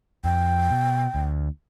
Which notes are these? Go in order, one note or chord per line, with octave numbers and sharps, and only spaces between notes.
F2 G5
B2
D2